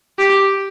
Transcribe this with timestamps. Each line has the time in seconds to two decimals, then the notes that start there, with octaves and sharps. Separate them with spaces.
0.19 G4